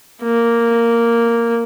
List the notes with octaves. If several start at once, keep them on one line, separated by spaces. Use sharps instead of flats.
A#3